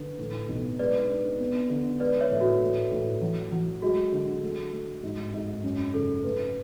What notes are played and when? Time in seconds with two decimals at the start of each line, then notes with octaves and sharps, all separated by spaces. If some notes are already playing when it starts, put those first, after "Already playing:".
Already playing: D3 B4
0.18 A2
0.49 B1
0.79 G#3 B4 D5
1.09 D4
1.40 B3
1.70 D3
2.00 G#3 B4 D5
2.21 C#5 E5
2.31 A2
2.40 F#4
2.61 A2
2.92 A2
3.21 F#3
3.52 F#3
3.82 G#3 F#4
4.12 D3
4.42 A3
4.73 A3
5.03 G#2
5.34 G#2
5.64 F#2
5.94 C#3 A4
6.24 A3 B4